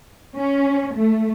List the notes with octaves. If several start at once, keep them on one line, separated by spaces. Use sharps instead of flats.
C#4
A3